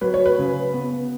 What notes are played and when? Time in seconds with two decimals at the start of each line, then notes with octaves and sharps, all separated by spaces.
0.01 F#3 B4
0.14 C#5
0.26 B4
0.38 C#3
0.73 B3